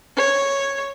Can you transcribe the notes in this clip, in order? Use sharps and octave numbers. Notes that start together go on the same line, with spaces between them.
C#5